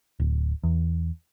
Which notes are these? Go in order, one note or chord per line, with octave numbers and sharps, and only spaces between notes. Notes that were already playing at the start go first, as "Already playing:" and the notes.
D1
E2